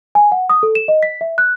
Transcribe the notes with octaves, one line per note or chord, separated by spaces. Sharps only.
G#5
F#5
D#6
A4
E7
D#5
B6
E5
F#6